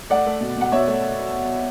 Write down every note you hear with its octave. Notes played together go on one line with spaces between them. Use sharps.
A3 D5 F#5
A3
B2
B2 F#5
B2 C#5 E5
A3